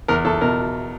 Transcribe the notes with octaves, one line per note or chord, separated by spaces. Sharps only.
E2 A#4
E2 A4
B2 A#4